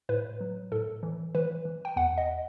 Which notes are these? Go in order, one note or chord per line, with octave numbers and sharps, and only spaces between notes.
A2 B4
F#3
A2 A4
E3
E3 B4
E3
G5
E2 F#5
D#5